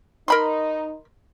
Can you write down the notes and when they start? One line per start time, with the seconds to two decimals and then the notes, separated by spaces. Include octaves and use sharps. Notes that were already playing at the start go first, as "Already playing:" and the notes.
0.28 D#4 A#4 B5 C6